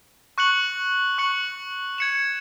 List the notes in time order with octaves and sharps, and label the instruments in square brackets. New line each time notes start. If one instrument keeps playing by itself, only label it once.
[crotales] C#6 F#6 C#7 F#7
C#6 F#6 C#7 F#7
G#6 C#7 E7